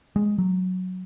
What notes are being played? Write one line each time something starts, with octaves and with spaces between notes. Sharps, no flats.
G#3
F#3